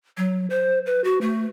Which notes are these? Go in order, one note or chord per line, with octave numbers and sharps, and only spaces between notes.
F#3
C5
B4
F#4
A3